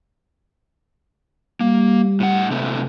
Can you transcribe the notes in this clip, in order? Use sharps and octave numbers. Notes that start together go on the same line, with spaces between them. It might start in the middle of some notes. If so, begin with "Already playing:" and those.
G3 A#3
A2 F#5
C3 A3 B3